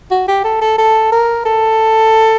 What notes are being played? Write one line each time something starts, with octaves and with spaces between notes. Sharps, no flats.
F#4
G4
A4
A4
A4
A#4
A4